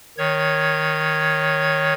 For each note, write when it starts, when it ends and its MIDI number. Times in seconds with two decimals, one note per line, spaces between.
0.18 1.94 51
0.18 1.94 73
0.18 1.94 92